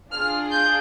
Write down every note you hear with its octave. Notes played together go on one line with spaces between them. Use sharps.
D4 F4 G#4 F6
G6